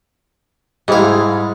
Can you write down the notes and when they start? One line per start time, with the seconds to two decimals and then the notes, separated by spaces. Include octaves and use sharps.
0.88 G#2 G3 G#3 E4 F5